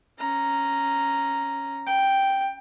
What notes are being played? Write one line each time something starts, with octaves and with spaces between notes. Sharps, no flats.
C#4 A#5
G5